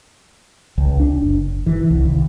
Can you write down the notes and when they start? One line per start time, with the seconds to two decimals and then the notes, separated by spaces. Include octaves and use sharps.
0.78 C#2
1.00 D4
1.22 F#1
1.66 E3
1.90 C2
2.05 D#2